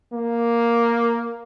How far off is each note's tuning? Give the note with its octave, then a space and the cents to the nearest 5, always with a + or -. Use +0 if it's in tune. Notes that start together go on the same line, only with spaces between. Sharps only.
A#3 +5